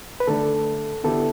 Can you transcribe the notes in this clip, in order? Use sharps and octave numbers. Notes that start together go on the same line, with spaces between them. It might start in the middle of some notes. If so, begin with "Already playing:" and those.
B4
D3 A3 D4 A4
D3 B3 E4 G4 A4